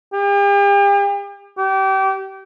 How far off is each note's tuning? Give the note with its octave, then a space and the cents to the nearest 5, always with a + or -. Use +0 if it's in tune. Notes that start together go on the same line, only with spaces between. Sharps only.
G4 +40
G4 -30